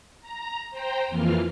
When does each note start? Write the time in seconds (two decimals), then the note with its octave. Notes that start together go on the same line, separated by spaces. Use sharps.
0.21 A#5
0.71 C5 G5 A#5
1.08 F2 E3 A#3 F4 F6